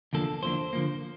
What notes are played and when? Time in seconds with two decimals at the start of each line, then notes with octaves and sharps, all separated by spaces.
0.13 E2 D3 F3 A#3 D4 A4
0.43 E2 D3 F3 A#3 D4 C5
0.73 D3 F3 A#3